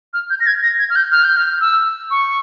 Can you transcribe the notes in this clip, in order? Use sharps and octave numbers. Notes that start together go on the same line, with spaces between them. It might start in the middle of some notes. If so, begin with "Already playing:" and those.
F6
G6
A#6
G#6
A#6
G#6
F6
G6
F6
G6
F6
E6
C#6